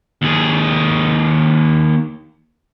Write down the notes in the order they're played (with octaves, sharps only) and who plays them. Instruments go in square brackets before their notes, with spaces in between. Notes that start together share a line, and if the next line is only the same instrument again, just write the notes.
[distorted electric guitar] D#2 G#4